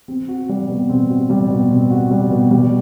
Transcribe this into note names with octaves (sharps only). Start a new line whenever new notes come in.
C4
F#4
G3
B2
C4
F#4
G3
B2
C4
F#4
G3
B2
G3